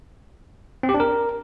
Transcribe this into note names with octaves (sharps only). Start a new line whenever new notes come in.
C4
G4
D4
A#4